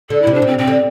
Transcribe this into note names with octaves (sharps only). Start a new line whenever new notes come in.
D3 A4
E4
C3
D4
C3 C4
C3 C4
D3